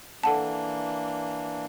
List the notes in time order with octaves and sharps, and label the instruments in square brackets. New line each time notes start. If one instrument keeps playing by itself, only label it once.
[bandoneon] E3 A#3 D4 [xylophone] A4 F#5 A5